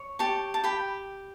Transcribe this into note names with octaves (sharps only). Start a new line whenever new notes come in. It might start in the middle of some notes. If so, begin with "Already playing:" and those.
Already playing: C#5
G4 A5 C#6
A5
G4 G5 B5